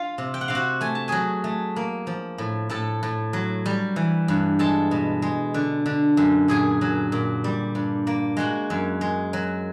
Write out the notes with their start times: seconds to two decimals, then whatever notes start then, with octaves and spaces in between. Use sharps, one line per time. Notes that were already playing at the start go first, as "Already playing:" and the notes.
Already playing: F4 F5
0.18 C3
0.34 G5
0.41 F#5
0.48 C3 F5
0.55 F#4 F#5
0.81 A3 G#5
0.95 A5
1.08 F#3 G#4 G#5
1.44 A3
1.76 A#3
2.07 F3
2.38 A2
2.70 A2 A4 A5
3.03 A2
3.33 F#3
3.66 G3
3.96 E3
4.28 G2
4.59 G#3 A4 A5
4.91 B2
5.22 G#3
5.54 D3
5.86 D3
6.17 F#2
6.48 A#2 G#4 G#5
6.81 F#3
7.12 A#2
7.44 G3
7.75 G2
8.07 A#3
8.37 G#3 F#4 F#5
8.70 F#2
9.01 G#3
9.33 F#3